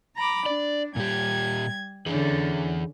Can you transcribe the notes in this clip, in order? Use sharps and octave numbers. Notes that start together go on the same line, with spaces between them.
A#5 B5 D6
D4 D5
A#2 G3 G4 G#6
D3 E3 C#4 G#4